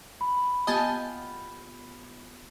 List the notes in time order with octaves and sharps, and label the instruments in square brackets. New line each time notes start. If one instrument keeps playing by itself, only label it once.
[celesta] B5
[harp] B3 F4 G4 [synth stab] D#5 G#5 A5